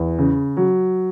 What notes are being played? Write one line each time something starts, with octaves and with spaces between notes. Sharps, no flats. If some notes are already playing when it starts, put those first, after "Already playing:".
Already playing: E2
C#3
F#3